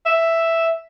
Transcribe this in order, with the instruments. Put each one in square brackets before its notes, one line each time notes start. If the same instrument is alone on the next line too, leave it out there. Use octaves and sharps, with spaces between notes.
[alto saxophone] E5